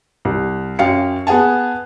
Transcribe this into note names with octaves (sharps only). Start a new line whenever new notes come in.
C2
F#2 C#4 F5 G5 C#7
B3 G#4 F#5 G#5 A5